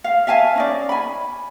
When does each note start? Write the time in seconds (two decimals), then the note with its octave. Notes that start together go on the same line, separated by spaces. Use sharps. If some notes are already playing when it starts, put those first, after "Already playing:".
0.04 F5
0.27 E5 F5 G#5 A5
0.55 C#4 D#4 D5
0.89 G#5 B5